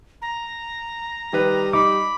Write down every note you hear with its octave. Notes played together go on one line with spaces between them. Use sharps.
A#5
D#3 G3 B4
D#4 B5 D6